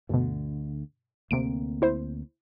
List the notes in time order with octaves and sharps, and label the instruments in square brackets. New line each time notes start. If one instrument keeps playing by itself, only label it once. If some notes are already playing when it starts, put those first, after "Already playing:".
[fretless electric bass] D2 D3 [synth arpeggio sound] G2 B2
[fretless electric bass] D2 A#3 C4 [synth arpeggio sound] C3 D7
[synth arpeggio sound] E4 C5